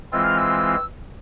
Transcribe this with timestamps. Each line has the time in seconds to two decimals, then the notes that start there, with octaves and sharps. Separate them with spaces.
0.12 E3 G#3 C4 F4 E6
0.24 F6
0.38 E6